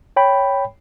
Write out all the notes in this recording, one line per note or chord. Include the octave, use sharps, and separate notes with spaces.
C#5 G5 B5